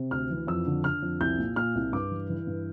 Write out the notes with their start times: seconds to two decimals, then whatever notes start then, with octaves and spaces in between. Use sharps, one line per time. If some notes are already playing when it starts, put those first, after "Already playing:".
Already playing: C3
0.11 D2 F6
0.30 E3
0.47 F2 E6
0.67 D3
0.84 D3 F6
1.02 F2
1.21 C2 G6
1.38 A#2
1.56 A#2 F6
1.75 C2
1.93 G2 D6
2.11 E3
2.30 E3
2.47 G2